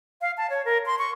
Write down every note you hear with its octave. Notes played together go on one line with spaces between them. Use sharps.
F5
A5
C#5
A#4
C6
C#6